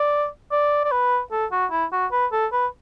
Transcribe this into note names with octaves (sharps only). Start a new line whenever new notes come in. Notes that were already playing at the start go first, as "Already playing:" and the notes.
Already playing: D5
D5
D5
B4
A4
F#4
E4
F#4
B4
A4
B4